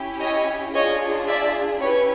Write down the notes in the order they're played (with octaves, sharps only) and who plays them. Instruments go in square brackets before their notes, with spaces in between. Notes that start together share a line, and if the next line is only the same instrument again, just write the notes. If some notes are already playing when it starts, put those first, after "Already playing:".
Already playing: [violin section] C#4 E4 G4
C#5 D#5
D4 F4 G#4 C#5 D#5
D5 E5
C#4 E4 G4 B4 C#5